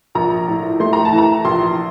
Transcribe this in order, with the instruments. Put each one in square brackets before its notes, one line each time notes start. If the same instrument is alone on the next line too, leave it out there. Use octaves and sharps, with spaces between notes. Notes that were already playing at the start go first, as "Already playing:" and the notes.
[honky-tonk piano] A#1 A#5
A2
A3 C6
A#5
A5
E3
A#5
A#1 C6